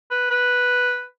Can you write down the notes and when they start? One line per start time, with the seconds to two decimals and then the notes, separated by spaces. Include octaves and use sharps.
0.11 B4
0.31 B4